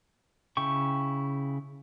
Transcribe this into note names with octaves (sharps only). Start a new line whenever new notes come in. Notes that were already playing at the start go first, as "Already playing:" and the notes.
C#3 E4 G5 C#6